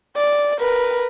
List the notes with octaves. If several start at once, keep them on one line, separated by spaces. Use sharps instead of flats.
D5
A#4 B4